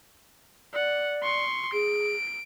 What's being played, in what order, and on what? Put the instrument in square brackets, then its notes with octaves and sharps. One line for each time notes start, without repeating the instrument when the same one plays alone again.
[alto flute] D5 [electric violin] F#5
[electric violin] C6 C#6
[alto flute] G#4 [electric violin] D7